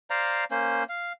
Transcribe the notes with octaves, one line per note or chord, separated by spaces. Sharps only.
C5 D5 F5 A#5
A#3 C#4 C5
F5